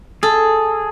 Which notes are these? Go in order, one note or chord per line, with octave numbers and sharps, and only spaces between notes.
G#4 A4